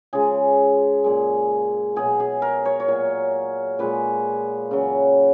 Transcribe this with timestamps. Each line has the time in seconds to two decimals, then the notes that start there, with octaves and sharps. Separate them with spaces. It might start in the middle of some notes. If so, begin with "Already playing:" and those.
0.13 C#3 F3 G#3 G#4
1.04 A#2 G#3
1.96 B2 F#3 G#4
2.20 G#4
2.42 A#4
2.65 C#5
2.80 C#5
2.88 A#2 F#3
3.79 A#2 F3 G#3 B4
4.71 C#3 F#3